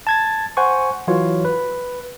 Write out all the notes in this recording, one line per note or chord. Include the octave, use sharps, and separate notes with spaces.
A5 G#6 A6
C5 F#5 G#5 C#6
E3 F#3 F4 F#4 C#5
B4